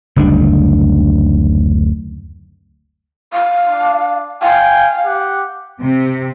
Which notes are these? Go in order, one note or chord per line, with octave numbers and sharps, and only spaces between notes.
F#1 D2 G3 D4
F5
D4
F5 G5 G#5
G4 F#5
C3